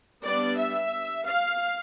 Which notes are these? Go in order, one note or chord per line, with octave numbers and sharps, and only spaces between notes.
G3 B3 D4 D5
E5
F5